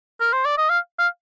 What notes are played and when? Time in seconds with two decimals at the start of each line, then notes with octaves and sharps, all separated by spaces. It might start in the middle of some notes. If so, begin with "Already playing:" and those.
0.21 A#4
0.33 C5
0.45 D5
0.58 D#5
0.70 F5
0.99 F5